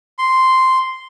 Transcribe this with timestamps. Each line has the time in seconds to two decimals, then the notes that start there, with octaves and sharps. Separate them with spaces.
0.19 C6